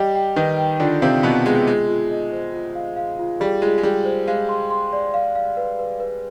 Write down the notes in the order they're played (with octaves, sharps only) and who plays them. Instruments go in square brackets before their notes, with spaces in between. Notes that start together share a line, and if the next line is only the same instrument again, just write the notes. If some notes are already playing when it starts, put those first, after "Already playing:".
Already playing: [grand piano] G3 G4 [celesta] D#5
[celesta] G5
[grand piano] D#3 D#4 [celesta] B4
[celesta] G5
[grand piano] D3 D4 [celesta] F4
[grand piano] C3 C4 [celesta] F5
[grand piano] B2 B3 [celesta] F4
[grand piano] G#3 [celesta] F4
[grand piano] G#3 [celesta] F4
[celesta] F4
D#5
C5
F4
F5
F5
F4
[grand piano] G3 [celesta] G#4
[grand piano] G#3 [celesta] F4
[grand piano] G#3
[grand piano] G3 [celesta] G#4
[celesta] C5
[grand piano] G#3 [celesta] F5
[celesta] C6
C6
D5
F5
F5
B4
B4
B4